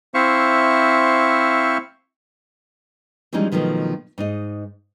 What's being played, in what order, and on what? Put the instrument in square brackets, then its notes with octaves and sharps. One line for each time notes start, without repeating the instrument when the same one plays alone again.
[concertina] C4 E4 C5 E5 F5 C#6
[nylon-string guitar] E3 F3 G3 G#3 C#4 D#4
B2 D#3 F3 F#3 A3
G#2 D#4 D#5